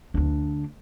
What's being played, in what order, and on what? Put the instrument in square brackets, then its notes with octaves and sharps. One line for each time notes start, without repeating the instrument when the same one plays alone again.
[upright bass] D2 D4